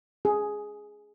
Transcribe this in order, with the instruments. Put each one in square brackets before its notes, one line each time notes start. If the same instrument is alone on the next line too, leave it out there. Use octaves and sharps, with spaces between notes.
[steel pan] G#4